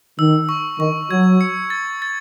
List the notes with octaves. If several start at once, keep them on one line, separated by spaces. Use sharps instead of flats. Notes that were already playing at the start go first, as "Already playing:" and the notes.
D#3 E6
C#6
D#3 C#6
F#3 G#6
C#7
A6
A6